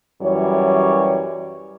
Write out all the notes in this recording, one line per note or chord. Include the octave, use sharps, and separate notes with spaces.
F#2 E3 G3 C#5